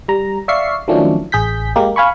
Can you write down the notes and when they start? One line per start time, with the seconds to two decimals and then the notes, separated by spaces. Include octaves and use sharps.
0.08 G3 A#5
0.48 D5 E5 F5 C#6 C7
0.88 D#3 F3 F#3 A3 C#4 D4
1.32 A1 G#4 G6 B6
1.76 G#3 A#3 G4
1.96 F5 G#5 B5 C#6